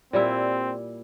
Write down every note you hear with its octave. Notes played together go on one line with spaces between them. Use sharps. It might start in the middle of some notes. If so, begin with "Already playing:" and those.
A#2 G3 C4 E4